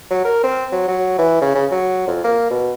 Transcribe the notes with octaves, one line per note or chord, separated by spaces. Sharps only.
F#3
A#4
C4
F#3
F#3
E3
C#3
C#3
F#3
F2
A#3
B2